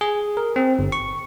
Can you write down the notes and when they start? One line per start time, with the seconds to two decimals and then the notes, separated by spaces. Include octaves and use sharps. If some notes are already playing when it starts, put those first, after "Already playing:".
0.01 G#4
0.37 A#4
0.56 C4
0.79 G1
0.92 C#6